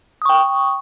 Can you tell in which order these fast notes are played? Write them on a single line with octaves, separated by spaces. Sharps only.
D#6 C#6 G5